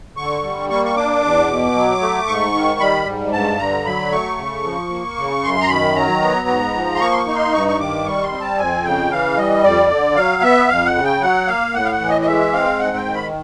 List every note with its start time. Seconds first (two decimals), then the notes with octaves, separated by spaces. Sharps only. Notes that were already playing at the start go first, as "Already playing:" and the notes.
0.17 D3 C#6
0.43 G3
0.69 A#3 C#6
0.85 C#6
0.96 D4 D6
1.22 E2
1.48 B2
1.75 F#3
2.01 A3
2.27 G#2 C#6
2.54 D#3
2.80 G3 B5
3.06 G#2
3.33 G2 A5
3.59 D3 A#5
3.85 F#3 B5
4.11 A3 C#6
4.37 C#3
4.64 F3
4.90 A#3
5.16 C#3
5.43 F#2 C6
5.61 A#5
5.69 D#3 B5
5.95 F#3 A#5
6.22 B3
6.48 G#2
6.74 F3
6.95 C6
7.01 A#3 C#6
7.12 C6
7.18 C#6
7.27 D#4
7.35 C6
7.53 G2 C#6
7.68 C#6
7.79 D#3 D6
8.06 G3 C#6
8.23 C6
8.32 C4
8.41 A5
8.58 F2 G#5
8.84 C#3 G5
9.11 E3 F5
9.37 G3 D#5
9.63 F2 D5
9.90 D3
10.16 F#3 F5
10.42 B3 E5
10.69 F2 F5
10.86 F#5
10.95 C#3
11.04 G5
11.21 F#3 F#5
11.47 A#3 F5
11.74 A2 F#5
11.85 F5
11.91 F#5
12.00 E3
12.09 D#5
12.21 D#5
12.26 G#3 E5
12.53 C4 F5
12.79 G#2 F#5
12.96 G5
13.05 D#3
13.14 B5